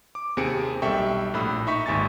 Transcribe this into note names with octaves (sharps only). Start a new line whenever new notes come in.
D6
D#2 C3 C4 G#4 C#7 D7
B1 G3 A4 E5 G5 C#6
A#1 A2 B5 E6
D#4 E5 C#6 B6
G#1 D#2 G#5 C#6 A6